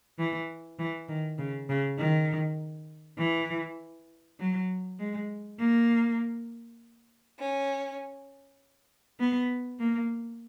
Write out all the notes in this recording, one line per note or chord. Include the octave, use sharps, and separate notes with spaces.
E3
E3
D#3
C#3
C#3
D#3
E3
F#3
G#3
A#3
C#4
B3
A#3